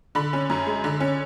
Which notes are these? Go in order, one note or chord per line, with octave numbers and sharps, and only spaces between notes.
D3 B5
C#4
F#2
G#3
D3
C#4